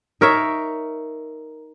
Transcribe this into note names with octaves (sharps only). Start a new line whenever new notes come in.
D#4 A#4 C#5 E5